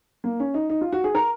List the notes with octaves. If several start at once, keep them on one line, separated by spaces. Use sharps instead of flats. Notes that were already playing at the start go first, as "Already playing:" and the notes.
A#3
C#4
D#4
D#4
F4
F#4
G#4
A#4